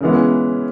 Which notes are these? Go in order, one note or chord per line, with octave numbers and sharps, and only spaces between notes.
C#3 E3 G#3 B3